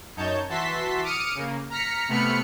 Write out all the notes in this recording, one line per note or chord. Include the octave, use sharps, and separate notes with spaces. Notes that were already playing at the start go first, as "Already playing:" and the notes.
F#2 D#4 C#5 A5 G6
E3 F#4 E5 A5 C6 B6
D6 D#6 F6 C#7 D#7
C#3 A#3
A#5 F6 B6 C#7
C3 A3 B3 B5 F6 C#7